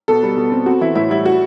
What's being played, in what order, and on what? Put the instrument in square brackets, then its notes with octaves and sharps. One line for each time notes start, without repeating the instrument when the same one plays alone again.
[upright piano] B2 A4
G3
B2
C4
C4 F#4
E3 E4
A2 E4
G3 E4
F#4